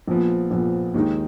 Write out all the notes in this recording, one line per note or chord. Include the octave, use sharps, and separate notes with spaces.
A#1 A#2 F3 B3
A#1 A#2 F3 B3
D#2 D#3 G#3 D#4